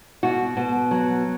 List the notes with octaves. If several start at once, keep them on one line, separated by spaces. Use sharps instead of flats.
B2 F#4
B2
F#3